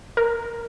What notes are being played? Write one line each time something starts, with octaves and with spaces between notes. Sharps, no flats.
A#4